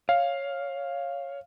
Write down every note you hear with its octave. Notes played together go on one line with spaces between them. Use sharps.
C#5 F5